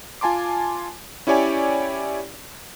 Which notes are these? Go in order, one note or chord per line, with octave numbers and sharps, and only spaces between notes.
F4 G#5 A5 C6 D6
C#4 E4 G4 C#5 D5 G#5